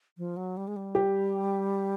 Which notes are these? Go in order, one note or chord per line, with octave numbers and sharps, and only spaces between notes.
F3
F#3
G3
G#3
G3
G4